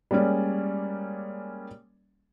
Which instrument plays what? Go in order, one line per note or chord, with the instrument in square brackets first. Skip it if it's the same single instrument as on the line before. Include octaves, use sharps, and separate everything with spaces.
[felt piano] G3 G#3 A#3 C#4 D5